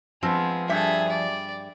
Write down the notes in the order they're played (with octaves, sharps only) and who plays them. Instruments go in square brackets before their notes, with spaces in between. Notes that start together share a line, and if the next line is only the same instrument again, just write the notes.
[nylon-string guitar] F3 [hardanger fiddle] G#3 [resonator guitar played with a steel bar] B3 C4
[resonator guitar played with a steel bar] G2 G3 E5 [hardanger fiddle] G#4 A4
[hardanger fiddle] D5